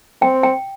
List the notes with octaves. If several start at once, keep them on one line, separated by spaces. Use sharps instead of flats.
C4 G5
G5